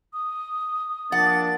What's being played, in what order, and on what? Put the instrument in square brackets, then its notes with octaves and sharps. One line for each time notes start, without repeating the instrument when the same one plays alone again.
[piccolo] D#6
[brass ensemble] F3 A#3 D4 [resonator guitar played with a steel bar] F#5 [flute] A6